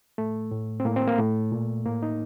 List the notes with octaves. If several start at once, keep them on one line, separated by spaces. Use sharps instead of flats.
A2 A3
A2
C4
A2 A#3
C4
A#3
A2 A3
A#2
A2 A#3
D#4